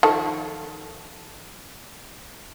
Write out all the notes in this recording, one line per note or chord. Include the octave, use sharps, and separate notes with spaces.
D#3 F3 A4